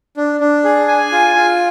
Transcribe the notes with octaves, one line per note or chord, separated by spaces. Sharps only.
D4
D4
G#4
G#5
F4
F4